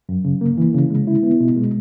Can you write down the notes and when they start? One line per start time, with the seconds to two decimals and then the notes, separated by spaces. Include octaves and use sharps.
0.09 F#2
0.25 C#3
0.41 A#3
0.58 E3
0.74 C#3
0.90 G#3
1.07 E4
1.23 B3
1.40 B2
1.56 G#3